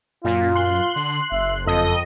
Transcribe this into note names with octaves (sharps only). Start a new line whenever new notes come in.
F#2 A#2 F4
C6 F#6
D3
F#1 E5
F2 A4 D#5